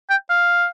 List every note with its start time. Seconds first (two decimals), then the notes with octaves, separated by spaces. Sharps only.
0.10 G5
0.30 F5